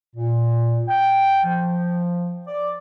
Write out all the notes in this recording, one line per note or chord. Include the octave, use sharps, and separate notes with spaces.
A#2
G5
F3
D5